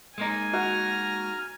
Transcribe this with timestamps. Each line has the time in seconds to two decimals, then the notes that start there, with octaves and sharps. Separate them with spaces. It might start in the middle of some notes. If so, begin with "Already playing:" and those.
0.18 G#3 A#3 D#4 G#5
0.53 F#4 A#5 F6